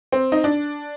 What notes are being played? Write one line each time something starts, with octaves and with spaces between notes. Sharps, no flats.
C4
D#4
D4